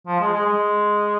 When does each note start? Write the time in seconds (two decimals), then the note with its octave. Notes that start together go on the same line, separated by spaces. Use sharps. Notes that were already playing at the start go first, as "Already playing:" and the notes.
0.07 F3
0.20 G#3
0.33 G#3
0.46 G#3